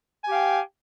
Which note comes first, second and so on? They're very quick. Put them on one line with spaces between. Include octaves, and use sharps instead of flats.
G#5 G4 F5 G5